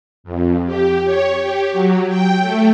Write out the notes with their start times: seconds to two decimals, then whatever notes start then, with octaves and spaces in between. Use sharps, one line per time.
0.24 F2
0.66 G4
1.05 C#5
1.40 G4
1.72 F#3
2.08 G5
2.41 A3